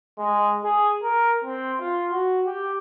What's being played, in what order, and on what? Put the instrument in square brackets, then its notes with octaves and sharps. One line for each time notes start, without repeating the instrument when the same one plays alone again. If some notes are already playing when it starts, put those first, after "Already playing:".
[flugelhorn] G#3
G#4
A#4
C4
F4
F#4
G4